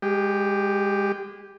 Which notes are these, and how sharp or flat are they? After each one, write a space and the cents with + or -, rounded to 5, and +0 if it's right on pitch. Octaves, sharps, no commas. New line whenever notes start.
G#3 -25 G4 +0